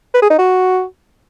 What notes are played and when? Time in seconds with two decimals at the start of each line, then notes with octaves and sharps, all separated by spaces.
0.14 B4
0.22 G#4
0.30 D#4
0.38 F#4